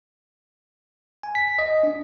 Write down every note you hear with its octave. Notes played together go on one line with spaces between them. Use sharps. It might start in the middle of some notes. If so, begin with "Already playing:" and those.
G#5
B6
D#5
D4